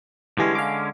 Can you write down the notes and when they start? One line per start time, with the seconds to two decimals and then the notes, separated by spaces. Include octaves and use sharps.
0.38 D3 E3 G3 G#3 C#4 G#4
0.55 F5 D6